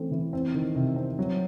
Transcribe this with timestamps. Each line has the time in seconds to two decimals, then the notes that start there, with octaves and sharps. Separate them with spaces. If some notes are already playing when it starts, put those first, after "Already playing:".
Already playing: E3 A3 C4 C#4
0.11 E3
0.33 C4
0.54 D#3
0.76 C3
0.96 C4
1.19 F#3